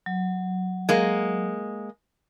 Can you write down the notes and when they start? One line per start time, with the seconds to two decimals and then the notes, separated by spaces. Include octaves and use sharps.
0.06 F#3
0.89 G#3 A#3